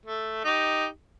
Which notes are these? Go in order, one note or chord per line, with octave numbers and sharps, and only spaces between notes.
A3
D#4 G4